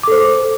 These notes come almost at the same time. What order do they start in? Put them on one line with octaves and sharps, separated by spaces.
D6 A4 C5